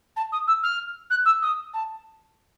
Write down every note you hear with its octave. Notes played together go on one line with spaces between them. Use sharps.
A5
D#6
E6
F6
F#6
E6
D#6
A5